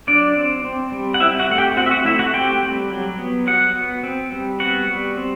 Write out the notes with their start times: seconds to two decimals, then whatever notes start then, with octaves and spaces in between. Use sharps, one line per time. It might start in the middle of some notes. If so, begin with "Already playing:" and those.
0.07 F#3 D4 D5
0.36 C4
0.65 C4
0.92 G3
1.14 F#5
1.20 C4 E4 E5
1.39 F#4 F#5
1.50 A3 F#5
1.58 G4 G5
1.77 C4 F#4 F#5
1.86 E5
1.91 F#4 F#5
2.05 A3 E4 E5
2.19 F#4 F#5
2.34 C4 G4 G5
2.62 G3
2.90 F#3
3.19 B3
3.47 F#3 F#4 F#5
3.75 B3
4.03 C4
4.32 G3
4.60 B3 F#4 F#5
4.88 G3
5.17 C4